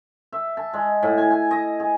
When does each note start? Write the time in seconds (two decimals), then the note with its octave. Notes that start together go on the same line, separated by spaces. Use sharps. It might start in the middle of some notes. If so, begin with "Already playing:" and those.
0.32 E5
0.57 A5
0.73 G#3
1.03 A2
1.18 G#5
1.31 G#5
1.51 D#5
1.80 G#4